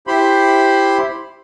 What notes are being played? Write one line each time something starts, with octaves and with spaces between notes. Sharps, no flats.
E4 G4 C5 B5 C6